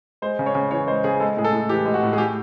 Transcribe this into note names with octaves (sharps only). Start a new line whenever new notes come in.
G#3 C5
C#3
C#5
C#3
E3 C#5
G#3 C5
C#3 G#4
G#3 A4
A2 G#4
A4
A2
E3 G4
G#3
F#4
A2
G#4
A2 G4